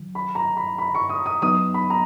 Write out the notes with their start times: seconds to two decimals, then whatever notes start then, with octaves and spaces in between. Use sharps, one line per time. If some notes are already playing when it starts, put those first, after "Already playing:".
Already playing: D#3 F#3
0.15 B5
0.35 A#5
0.57 B5
0.78 B5
0.95 C#6
1.09 D#6
1.26 D#6
1.42 F#3 B3 D#4 D#6
1.74 B5
1.90 A#5